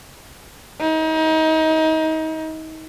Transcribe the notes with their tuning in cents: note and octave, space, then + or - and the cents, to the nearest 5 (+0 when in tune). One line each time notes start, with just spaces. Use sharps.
D#4 +30